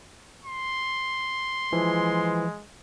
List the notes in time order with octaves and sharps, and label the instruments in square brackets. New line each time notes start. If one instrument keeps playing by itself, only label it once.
[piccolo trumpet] C6
[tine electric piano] E3 F3 [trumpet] G#3